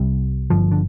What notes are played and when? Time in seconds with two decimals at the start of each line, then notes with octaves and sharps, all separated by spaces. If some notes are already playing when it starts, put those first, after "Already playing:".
Already playing: C2 C3 G3
0.50 G1 G2 D3 F3
0.72 D3